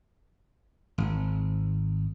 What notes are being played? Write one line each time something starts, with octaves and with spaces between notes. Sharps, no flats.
G#1